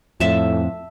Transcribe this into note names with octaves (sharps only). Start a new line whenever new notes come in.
F2 A2 E5 A5